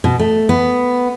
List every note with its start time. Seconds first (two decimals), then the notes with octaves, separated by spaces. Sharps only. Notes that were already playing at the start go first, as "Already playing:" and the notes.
0.04 B2
0.19 A3
0.49 B3